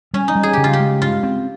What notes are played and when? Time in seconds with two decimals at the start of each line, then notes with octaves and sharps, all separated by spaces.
0.14 G3 C#4
0.28 D#4
0.35 G3
0.43 G#4
0.53 C#3 G4
0.64 F4
0.73 G4
0.80 G#3
1.02 G2 F4
1.23 C4